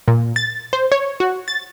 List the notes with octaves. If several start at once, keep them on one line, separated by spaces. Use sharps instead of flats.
A#2
A6
C5
C#5
F#4
A6